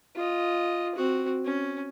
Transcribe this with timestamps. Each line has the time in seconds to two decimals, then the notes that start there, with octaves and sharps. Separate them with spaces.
0.16 F4 D#5
0.96 C4 F#4
1.44 C#4